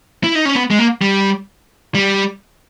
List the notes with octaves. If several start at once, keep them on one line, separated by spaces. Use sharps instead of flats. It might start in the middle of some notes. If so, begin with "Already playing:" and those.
E4
D#4
C#4
B3
G#3
A#3
G3
G3